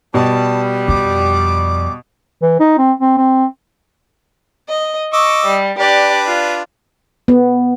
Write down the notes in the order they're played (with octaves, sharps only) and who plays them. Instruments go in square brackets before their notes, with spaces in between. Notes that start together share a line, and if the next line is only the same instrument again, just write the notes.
[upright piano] B2 [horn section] G3 [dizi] A5
[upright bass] F2 [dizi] D6
[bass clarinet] E3
D#4
C4
C4
C4
[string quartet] D#5
[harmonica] D#5 D6 E6 [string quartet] C#6
[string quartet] G3
[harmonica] D4 B4 [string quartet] G4 D5
[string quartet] F4
[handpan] B3